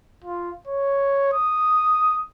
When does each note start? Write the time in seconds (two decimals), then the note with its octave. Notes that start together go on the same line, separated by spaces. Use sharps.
0.24 F4
0.68 C#5
1.33 D#6